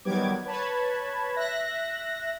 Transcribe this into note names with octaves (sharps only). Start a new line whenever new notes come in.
D#3 F#3 G3 B3 D6 G#6
B4 C#5 A5 B5 G#6
E5 F#6 A#6